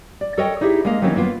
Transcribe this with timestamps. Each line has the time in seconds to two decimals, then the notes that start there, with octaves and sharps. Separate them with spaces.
0.21 D5
0.37 A4 A#4 C#5 D#5 G5
0.61 D#4 E4 G4 G#4 E5
0.85 G#3 A#3 D#5 F5
1.02 D#3 E3 F#3 A#3 C4 C#4
1.16 A#3 B3 F4